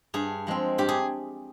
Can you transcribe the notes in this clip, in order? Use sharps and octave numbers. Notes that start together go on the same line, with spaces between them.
G2 G#4
F3 G#3 C4
G2 G4
G#4